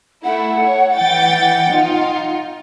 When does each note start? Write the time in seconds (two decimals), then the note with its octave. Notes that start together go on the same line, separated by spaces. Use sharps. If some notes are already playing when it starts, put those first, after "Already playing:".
0.24 A3 E4 F#5
0.65 C#5
0.95 E3 G5 A6
1.74 D#4 F4